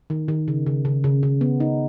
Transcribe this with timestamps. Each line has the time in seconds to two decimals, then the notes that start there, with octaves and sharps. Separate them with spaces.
0.10 D#3
0.28 D#3
0.48 C#3
0.66 C#3
0.85 C#3
1.04 C#3
1.23 C#3
1.41 B3
1.60 D#4